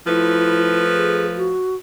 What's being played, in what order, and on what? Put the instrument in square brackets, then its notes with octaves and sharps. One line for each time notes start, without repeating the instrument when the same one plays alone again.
[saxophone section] F3 A3 B4 [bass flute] E4
[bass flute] G#4
F#4